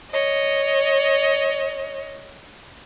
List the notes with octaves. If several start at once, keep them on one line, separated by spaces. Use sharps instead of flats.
C#5 D#5